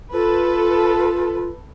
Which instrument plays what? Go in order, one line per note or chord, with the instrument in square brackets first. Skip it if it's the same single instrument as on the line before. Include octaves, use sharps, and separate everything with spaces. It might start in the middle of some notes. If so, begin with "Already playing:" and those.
[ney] F4 [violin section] A4 B4